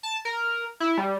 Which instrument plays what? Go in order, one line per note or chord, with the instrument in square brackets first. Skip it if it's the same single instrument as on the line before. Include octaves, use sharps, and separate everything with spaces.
[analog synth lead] A5
A#4
E4
G3